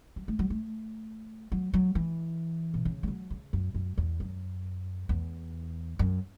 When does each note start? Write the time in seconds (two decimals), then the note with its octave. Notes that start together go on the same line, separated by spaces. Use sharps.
0.16 F#3
0.28 A3
0.39 F#3
0.50 A3
1.52 F#3
1.74 F#3
1.95 E3
2.74 B2
2.85 C#3
3.03 A3
3.08 F#3
3.30 C#3
3.53 F#2
3.74 F#2
3.98 E2
4.20 F#2
5.09 E2
5.99 F#2